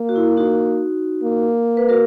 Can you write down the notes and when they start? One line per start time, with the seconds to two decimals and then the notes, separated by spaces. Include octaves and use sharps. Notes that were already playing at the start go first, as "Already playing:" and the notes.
Already playing: A#3
0.09 F#4
0.16 E4
0.37 D#4 F#4
1.23 A#3
1.77 B4
1.89 F#4 A#4